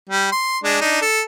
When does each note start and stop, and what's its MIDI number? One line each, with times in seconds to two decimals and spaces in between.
0.10 0.30 55
0.32 0.59 84
0.64 0.77 56
0.64 0.77 62
0.81 1.01 62
0.81 1.01 63
1.02 1.21 69